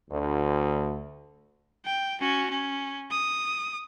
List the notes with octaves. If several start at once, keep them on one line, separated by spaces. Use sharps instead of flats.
D2
G5
C#4 F#4
C#4
D#6